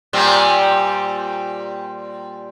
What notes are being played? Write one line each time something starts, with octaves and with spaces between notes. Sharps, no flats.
A#2 G3 C4